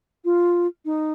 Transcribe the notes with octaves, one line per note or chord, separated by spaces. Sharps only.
F4
D#4